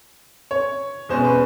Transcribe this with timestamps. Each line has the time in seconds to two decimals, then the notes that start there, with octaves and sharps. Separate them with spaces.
0.51 C#5
1.09 E2 B2 G#3 C#4 C5
1.25 B4